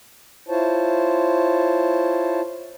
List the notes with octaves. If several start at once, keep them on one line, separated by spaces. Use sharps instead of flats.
E4 F4 C5 C#5 A5